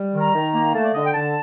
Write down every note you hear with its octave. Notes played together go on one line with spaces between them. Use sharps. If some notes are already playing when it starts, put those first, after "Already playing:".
Already playing: G3
D#3
A#5
D#3
A#3
A3 A5
D5
D3 D#5
G5
D3 A5